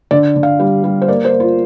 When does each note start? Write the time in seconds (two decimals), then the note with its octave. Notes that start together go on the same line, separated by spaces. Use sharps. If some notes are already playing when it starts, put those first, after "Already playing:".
0.11 D3 D5
0.36 D3
0.43 F5
0.60 G3
0.84 G3
1.02 C5
1.08 A#3 D5
1.25 C5
1.33 A#3
1.40 F4